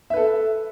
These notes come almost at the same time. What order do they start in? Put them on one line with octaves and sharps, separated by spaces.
E5 B4 A4